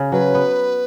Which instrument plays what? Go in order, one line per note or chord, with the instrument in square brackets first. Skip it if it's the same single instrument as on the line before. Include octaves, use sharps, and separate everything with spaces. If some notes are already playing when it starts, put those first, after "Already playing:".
Already playing: [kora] C#3
[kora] F#3 [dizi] B4
[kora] B3